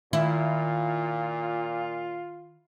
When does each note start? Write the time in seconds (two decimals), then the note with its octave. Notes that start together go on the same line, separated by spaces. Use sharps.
0.13 A#2 D#3 E4 F4